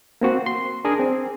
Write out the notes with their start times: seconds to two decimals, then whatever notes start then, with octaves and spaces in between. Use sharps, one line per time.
0.21 A#3 C4 F#4
0.46 C6
0.85 D4 G#4 A#4
1.00 C4